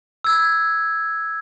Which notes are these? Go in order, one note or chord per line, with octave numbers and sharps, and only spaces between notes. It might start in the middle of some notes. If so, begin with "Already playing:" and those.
E6 G#6